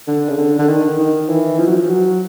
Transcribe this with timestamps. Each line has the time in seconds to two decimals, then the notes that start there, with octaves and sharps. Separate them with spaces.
0.07 D3
0.29 C#3
0.37 D3
0.58 D3
0.68 D#3
0.99 D#3
1.29 E3
1.59 F3
1.67 F#3
1.75 F3
1.89 F#3